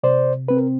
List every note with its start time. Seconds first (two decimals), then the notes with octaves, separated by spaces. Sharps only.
0.03 C3 C5 D5
0.48 C4 B4
0.57 A#4